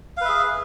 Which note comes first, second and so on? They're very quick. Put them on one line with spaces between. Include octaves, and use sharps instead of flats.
F5 B4 E5 G#4